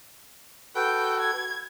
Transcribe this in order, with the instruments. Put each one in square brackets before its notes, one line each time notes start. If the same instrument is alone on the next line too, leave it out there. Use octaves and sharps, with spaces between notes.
[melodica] F#4 A4 B4 [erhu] G5
[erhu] G#6